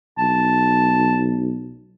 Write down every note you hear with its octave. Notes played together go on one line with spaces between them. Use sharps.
B1 A5